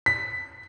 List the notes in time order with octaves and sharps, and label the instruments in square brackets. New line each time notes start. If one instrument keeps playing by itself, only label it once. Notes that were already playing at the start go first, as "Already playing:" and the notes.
[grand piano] B6